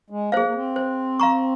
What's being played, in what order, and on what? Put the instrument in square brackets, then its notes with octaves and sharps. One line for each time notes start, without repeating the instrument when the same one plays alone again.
[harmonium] G#3
[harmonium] A#3 [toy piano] G#4 C5 F5
[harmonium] A#3
C4
[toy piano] C5
F5 A#5 C#6